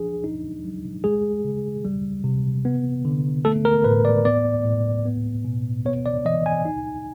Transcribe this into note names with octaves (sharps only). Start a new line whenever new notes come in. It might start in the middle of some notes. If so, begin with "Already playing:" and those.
Already playing: F3 D4 G#4
D#4
F#3
G#3 G#4
C#3
G3
C3
B3
D3
A3 A4
A#4
A2 B4
D5
B3 D5
A2
B3
B2
B3 C#5
D5
E3 D#5
G#5
D#4